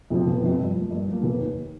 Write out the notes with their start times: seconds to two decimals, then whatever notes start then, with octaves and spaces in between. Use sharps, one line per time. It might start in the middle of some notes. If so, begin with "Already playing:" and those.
0.10 F2 C3 F3
0.27 F1
0.43 F2 C3 F3
0.59 G2
0.75 F3 A#3
0.91 G2
1.07 F3 A#3
1.23 F1
1.40 D#2 D#3